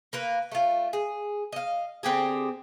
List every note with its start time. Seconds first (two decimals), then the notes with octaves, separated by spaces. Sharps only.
0.13 A#3 A#4 B4
0.52 A3 F4
0.93 G#4
1.53 D#5 F5
2.03 D3 C4 G4 G#4